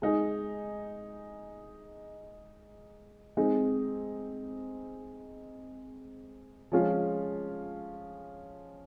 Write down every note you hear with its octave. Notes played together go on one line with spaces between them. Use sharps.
G#3 D#4 G#4
G#3 C4 D#4 G#4
F3 G#3 C#4 F4